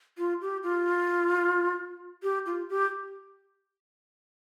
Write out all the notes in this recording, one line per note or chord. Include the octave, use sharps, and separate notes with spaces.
F4
G4
F4
G4
F4
G4